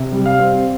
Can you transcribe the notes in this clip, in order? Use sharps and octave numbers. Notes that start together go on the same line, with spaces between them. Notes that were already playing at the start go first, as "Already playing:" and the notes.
Already playing: C3
G3
F5
C4